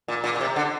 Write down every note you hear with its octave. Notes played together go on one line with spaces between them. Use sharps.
A#2
A#2
A#2
C3
D3